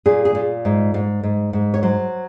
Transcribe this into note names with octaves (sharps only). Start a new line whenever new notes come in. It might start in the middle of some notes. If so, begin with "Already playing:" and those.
A#2 G#4
G#4
A#2
G#2
G#2
G#2
G#2
C#5
F#3 C5